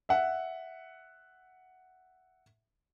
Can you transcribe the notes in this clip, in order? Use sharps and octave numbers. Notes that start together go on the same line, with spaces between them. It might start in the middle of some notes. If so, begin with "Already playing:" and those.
E5 F#5